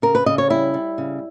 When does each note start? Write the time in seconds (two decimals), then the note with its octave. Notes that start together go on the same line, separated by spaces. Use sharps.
0.02 C#3 A#4
0.15 B4
0.26 C#3 D#5
0.38 C#5
0.50 G3 E4
0.74 G3
0.98 C#3